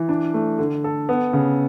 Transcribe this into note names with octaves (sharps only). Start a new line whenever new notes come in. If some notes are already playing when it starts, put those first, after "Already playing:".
Already playing: E3
D4
A3
D3
A4
B3
C#3